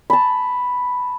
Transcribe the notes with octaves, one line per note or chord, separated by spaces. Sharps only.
A5 B5